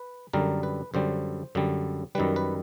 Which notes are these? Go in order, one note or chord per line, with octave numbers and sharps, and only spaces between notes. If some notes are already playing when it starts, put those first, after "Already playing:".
Already playing: B4
F#2 D3 G3 A#4
B4
F#2 D3 G3 C5
F#2 D3 G3
F#2 D#3 G3 B4
B4